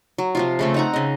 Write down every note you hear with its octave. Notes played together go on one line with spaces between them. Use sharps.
F#3
C3 F3 F4
C#3 A3 C4
D#4 F#5 A#5
C#3 D#5